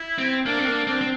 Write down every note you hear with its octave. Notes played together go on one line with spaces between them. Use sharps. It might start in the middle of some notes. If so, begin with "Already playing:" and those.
Already playing: E4
C4
A#3 D4
C4
A#3 D4
C4 D4
C4